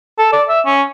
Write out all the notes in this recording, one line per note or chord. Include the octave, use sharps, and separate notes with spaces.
A4
D5
E5
C#4